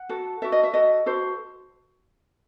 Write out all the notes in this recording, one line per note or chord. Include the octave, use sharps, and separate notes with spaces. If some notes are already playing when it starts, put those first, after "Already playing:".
Already playing: F#5
F#4 A4
F#4 A4 E5
D#5
E5
F#4 A4 D#5
F#4 A4 C5